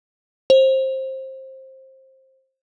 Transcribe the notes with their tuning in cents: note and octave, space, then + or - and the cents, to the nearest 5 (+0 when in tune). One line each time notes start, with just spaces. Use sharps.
C5 +20